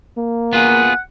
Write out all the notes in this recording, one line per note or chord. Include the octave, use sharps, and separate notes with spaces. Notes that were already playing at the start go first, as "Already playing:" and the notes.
A#3
B3 F4 G#4 F#5